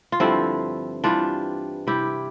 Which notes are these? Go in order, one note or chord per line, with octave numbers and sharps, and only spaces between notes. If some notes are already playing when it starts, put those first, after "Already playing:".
F4
G2 D3 F3 C4 E4
G2 E3 G3 D4 F4
C3 G3 E4 G4